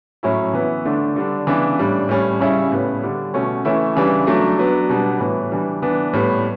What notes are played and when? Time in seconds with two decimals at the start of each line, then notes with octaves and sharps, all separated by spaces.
0.23 A2 F#3 C#4 E4
0.53 E3 B3 E4
0.85 D3 A3 D4
1.16 D3 G3 D4
1.47 C#3 E3 B3 D4
1.79 A2 G3 D4
2.09 A2 G3 C#4
2.41 C#3 G3 C#4 E4
2.72 A2 G3 B3
3.03 D3 G3 D4
3.34 B2 A3 C#4
3.65 E3 A3 C#4 E4
3.96 C#3 E3 G3 D4
4.27 F#3 A3 D4
4.58 F#3 B3 D4
4.89 B2 G3 B3 D4
5.20 A2 E3 B3
5.51 E3 G3 D4
5.82 E3 B3 D4
6.13 A2 G3 B3